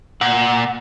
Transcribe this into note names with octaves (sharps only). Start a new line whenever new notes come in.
A#2 F#5